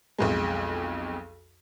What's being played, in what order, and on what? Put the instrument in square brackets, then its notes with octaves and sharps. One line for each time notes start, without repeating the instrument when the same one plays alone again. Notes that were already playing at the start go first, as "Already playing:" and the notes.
[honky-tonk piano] B1 F2 G#3